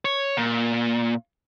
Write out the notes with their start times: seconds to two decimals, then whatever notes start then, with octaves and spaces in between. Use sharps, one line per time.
0.05 C#5
0.37 A#2